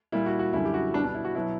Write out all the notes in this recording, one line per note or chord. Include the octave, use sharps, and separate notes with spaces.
A#2 G3 E4
F#4
F#4
F#2 D3 G3 E4
G4
F#4
B2 G3 D4
D4
E4
F#4
B2 F#3 E4